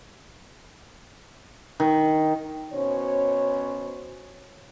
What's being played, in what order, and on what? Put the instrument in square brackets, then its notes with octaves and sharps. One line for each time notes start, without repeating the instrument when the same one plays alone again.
[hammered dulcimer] D#3
[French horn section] B2 C#4 C5 C#5